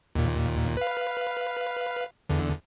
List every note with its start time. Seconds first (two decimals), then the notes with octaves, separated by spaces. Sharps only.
0.15 D#2 A#2
0.77 B4 F5
2.29 E2 D3